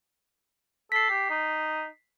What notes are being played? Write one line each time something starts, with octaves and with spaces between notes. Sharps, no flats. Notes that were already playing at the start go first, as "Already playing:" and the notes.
A4 B6 C7
G4
D#4